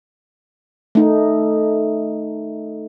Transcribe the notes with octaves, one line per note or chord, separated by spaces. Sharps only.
A3 D#4